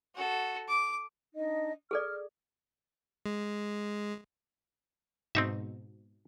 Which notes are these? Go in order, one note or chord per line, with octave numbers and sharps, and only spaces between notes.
F#4 A4
D6
D4 D#4 D#5
G#4 A4 D5 F6
G#3
G#2 B2 C4 D#4 E5